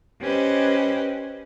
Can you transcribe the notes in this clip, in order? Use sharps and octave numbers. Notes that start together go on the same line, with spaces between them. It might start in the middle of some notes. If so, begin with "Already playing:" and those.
C#4 G4 B4 C5 D#5